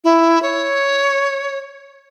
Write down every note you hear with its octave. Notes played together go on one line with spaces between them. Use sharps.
E4
C#5